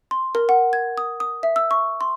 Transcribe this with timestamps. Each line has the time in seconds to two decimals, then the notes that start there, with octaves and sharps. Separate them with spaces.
0.11 C6
0.35 A#4
0.49 F#5
0.73 G#6
0.98 D#6
1.20 D#6
1.43 E5
1.56 E6
1.71 C#6
2.01 C6